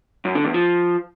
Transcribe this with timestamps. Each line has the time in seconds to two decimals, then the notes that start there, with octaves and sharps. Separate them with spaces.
0.25 F#2
0.35 D3
0.44 E2
0.54 F3